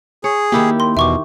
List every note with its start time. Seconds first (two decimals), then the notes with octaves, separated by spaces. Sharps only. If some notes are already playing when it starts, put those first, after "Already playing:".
0.24 G#4 C#5
0.52 D#3 A#3 E4 G4
0.80 C6
0.97 E2 B2 E5 C#6 D6